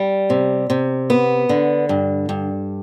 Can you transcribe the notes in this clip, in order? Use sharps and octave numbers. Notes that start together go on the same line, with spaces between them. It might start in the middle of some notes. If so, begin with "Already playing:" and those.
Already playing: G3
C3
C3
B3
D3
G2
G2